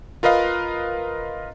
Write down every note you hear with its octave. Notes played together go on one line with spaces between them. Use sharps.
F4 A#4 B4 D#5 F5